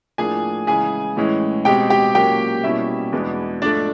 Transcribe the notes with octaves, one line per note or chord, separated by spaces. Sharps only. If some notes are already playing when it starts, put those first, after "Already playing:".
A2 F3 A#3 D4 G#4 G#5
C#3 E3 G#3 G#4 G#5
A2 E3 G#3 C#4
B2 G#3 C4 G4 G5
G4 G5
A#2 F#3 A#3 C#4 G4 G5
B2 G3 A#3 C#4 E4 E5
E2 B2 G#3 B3 D4
G#2 F3 A3 D4 D5